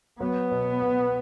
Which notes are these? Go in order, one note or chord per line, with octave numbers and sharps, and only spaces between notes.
F#3 B3
B2
B2